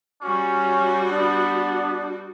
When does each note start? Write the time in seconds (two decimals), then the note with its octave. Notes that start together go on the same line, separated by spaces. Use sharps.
0.23 G3 C#4 F#4
1.09 B3 D4